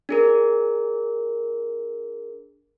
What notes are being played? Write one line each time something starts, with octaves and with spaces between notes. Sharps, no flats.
D4 G#4 A#4